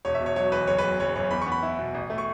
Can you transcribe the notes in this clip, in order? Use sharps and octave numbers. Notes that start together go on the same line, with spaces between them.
E1 C#5
E5
B2
C#5
F#3 C#5
E2 B4
F#1 C#5
B4
F#3
F#1 C#5
F#2 C#5
E2 B5
C#6
B3
B5
E4
B2
A1
A3
C#6